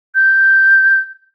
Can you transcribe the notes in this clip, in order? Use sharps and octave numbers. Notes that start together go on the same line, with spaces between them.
G6